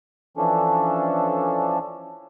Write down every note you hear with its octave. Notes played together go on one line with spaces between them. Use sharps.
E3 F3 C#4 D4 A4